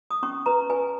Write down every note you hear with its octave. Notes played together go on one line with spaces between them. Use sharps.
D#6
C#4 C#6
B4 A#5
B4 G#5